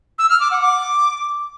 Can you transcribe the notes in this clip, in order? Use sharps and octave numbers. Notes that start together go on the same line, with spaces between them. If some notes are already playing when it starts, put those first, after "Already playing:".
E6
F6
D6
F#5
D6